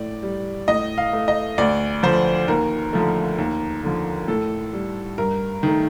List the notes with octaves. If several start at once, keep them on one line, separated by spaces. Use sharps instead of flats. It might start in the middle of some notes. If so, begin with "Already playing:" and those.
Already playing: A2 D5
G3
A2 D#5
F5
A3
D#5
D2 D5
D3 F3 C5
D#2 A#4
D3 F3 A3
D#2
D3 F3
A2 A4
G3
G2 A#4
D#3 A3